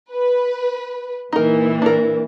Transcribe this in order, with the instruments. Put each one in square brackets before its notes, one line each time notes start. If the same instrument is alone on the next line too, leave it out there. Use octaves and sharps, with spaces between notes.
[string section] B4
[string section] A#2 E3 [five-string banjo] D#4 A#4
[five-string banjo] D4 A#4